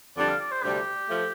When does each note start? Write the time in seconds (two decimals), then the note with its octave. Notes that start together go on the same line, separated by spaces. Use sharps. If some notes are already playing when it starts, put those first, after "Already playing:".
0.17 F2 D3 G3 D4 D5
0.28 F5
0.40 D5
0.51 C5
0.63 D2 C3 G3 D4 G4
1.09 F3 A3